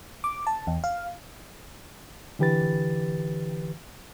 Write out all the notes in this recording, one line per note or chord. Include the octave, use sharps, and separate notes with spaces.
D6
A5
E2
F5
D3 E3 G4 B4 A6